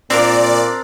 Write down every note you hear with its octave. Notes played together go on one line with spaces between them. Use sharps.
A#2 C4 D4 A#4 D5